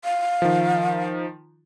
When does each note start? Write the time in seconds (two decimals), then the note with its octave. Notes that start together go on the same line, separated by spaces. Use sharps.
0.04 F5
0.42 D#3 F3